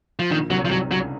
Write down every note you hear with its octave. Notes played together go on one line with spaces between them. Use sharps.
F3
A#1 A#2 D#3
C2 C3 F#3
F3
C2 C3 F#3
C#2 C#3 F#3